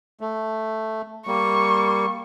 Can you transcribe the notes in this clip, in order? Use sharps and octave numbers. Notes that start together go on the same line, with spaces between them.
A3
G3 A#3 C#6